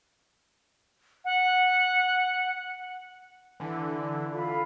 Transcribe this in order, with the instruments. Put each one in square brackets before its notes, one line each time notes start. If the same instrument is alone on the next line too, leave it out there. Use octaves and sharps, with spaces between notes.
[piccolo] F#5
[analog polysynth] D3 E3
[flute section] F4 A4 B5